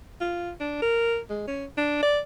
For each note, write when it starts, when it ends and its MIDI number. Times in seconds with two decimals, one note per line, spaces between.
0.21 0.52 65
0.60 0.77 62
0.82 1.19 70
1.30 1.46 56
1.47 1.66 61
1.78 2.02 62
2.03 2.20 74